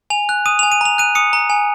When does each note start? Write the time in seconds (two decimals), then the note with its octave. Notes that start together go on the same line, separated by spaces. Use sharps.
0.10 G#5 F7
0.29 F#6
0.46 D#6 D#7
0.59 G#5 F7
0.72 D#7
0.81 A#5 F7
0.98 F#6 D#7
1.15 D#6 C#7
1.33 A#5
1.50 G#5